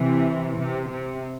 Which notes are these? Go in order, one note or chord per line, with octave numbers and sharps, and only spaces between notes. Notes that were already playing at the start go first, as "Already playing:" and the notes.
Already playing: C3 E3
C3
C3